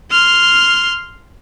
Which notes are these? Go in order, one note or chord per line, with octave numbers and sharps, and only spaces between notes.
C6 F6